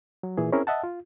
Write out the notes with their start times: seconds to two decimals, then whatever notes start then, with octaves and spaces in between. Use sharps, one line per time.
0.23 F#3
0.37 A#2 E3 G#4
0.52 C4 C#4 E4 G#4 A#4
0.67 D#5 E5 F#5 A5
0.84 F4